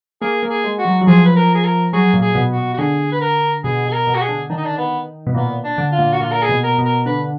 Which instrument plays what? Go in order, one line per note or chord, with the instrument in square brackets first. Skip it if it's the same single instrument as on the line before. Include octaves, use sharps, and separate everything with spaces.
[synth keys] A#3 [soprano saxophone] G#4
[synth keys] A#3
[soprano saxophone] G#4
[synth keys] G#3
[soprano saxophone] F#4
[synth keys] F#3
F#3
[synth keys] F3 [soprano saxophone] G#4
[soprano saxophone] B4
A#4
G#4
A#4
[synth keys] F#3 [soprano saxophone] G#4
[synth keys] A#2
[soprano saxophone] G#4
[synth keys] B2
[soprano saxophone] F#4
[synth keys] B2
[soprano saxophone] F#4
[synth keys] D3 [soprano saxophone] G#4
[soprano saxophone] B4
A#4
[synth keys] B2 [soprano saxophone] G#4
[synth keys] B2 [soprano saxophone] G#4
[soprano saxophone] A#4
[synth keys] B2
[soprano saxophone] F#4
G#4
[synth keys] D3
[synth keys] D#3 [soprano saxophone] D4
[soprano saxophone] D#4
D4
B3
[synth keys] B2
[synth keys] A#2 [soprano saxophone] B3
[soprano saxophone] D4
[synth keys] D3
[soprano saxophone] F4
[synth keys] A#2
[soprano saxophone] F#4
[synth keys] A#2 [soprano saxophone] F4
[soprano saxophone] A#4
G#4
[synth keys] B2
[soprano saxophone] A#4
[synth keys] B2
[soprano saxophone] A#4
[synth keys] D3 [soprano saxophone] B4